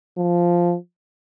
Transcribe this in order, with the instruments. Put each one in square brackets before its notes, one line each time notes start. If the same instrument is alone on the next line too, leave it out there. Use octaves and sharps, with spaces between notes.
[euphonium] F3